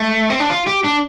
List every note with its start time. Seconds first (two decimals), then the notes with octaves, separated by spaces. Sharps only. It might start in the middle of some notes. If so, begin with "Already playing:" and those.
Already playing: A3
0.30 C4
0.40 D4
0.50 F4
0.67 G4
0.84 D4